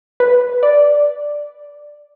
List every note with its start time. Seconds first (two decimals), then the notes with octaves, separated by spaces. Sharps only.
0.20 B4
0.63 D5